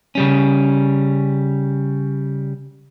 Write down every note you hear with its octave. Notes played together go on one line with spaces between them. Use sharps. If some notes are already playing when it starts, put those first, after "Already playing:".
C#3 G3 C#4